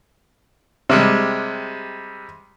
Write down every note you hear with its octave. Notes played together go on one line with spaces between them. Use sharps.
C3 G3 G#3